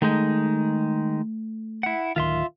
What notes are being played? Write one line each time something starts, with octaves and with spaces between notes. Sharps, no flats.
D#3 G#3 A3 D#4
E4 F#5
D1 D#3 F4 E5 C6